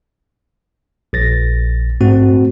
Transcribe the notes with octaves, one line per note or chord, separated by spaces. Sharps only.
A#1 A6 A#6
G#2 A3 C4 F#4